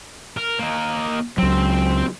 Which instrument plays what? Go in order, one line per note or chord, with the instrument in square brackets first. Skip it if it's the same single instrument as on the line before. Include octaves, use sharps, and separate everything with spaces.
[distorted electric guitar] A#4
A#3 D#4
[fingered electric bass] C#2 F#3 [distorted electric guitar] C4